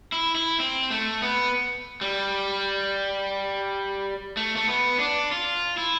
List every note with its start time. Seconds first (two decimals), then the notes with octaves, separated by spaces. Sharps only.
0.12 E4
0.35 E4
0.60 C4
0.91 A3
1.22 B3
2.01 G3
4.37 A3
4.56 A3
4.67 B3
4.99 D4
5.31 F4
5.78 E4